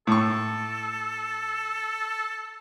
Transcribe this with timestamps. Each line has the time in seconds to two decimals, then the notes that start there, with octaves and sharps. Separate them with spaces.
0.07 A2 A4 C#6